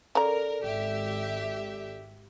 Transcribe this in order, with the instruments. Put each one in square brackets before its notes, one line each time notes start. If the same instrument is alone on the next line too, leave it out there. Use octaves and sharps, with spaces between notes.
[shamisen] C#3 A#5 [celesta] A4 D5 [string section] A#4
[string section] G#1 G4 E5